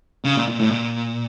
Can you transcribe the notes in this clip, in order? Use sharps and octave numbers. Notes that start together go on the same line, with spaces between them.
C#3
A#2
A#2
A2
A#2